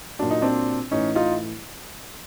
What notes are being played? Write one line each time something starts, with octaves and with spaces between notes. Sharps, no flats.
A#2 F#3 D4
D#4
C4 D4
A2 E3 C#4 D#4
D#4 F4